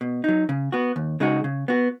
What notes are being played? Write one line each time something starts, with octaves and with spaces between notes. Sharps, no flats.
B2
F#3 D#4
C#3
B3 F#4
D#2
C#3 G#3 D#4 F#4
C#3
B3 F#4